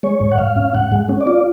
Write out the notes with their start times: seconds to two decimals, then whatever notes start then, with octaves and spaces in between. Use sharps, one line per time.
0.03 G#3 C#5
0.21 G#2
0.32 F#5
0.38 G#2 F5
0.56 C#4
0.75 G#2 F#5
0.92 G#3
1.09 C#4
1.21 D5
1.27 F4